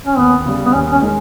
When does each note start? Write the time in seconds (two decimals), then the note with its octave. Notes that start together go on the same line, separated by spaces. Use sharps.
0.06 C#4
0.17 D#2 B3
0.46 C#3 G3
0.66 B3
0.73 D#2 C#4
0.92 C#4
1.01 D#3 G#3